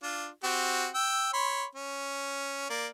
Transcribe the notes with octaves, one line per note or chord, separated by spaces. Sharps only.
D4 F4
C4 F#4 G4
G5 E6
C#5 B5 C6
C#4
A#3 D5